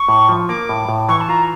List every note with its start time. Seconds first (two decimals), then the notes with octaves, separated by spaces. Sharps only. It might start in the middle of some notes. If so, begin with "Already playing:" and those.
Already playing: C#6
0.08 A2
0.29 F3
0.49 A#3 D6
0.69 A2
0.89 A2
1.09 E3 C#6
1.21 A5
1.29 F4 A#5